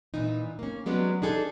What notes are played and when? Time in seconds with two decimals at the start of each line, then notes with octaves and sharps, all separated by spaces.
0.14 A#2 E3 D#4
0.59 A#3 C#4
0.86 F#3 G#3 B3 C#4 D4
1.22 D4 D#4 G#4 A4